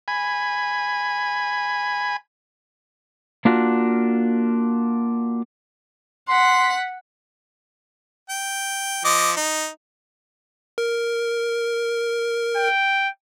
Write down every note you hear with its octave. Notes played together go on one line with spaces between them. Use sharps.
G#5 B5
A#3 D4 F4 F#4
F#5 C6 B6
G5
F3 D#5 D6
D#4
A#4
G5